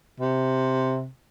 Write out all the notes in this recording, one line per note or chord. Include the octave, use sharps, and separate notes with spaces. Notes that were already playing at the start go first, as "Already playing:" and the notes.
C3